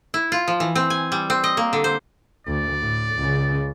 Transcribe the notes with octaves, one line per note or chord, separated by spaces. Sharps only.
E4
F4
F3
E3
C4
G#5
G3
C4
D#5
A#3
D3
C5
D2 D5
A2
C#2 C#3